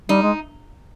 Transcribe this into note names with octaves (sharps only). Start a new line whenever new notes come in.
G3 D#4
G#3